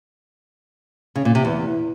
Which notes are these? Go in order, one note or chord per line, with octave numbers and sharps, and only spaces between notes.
C#3
A#2
C3
E2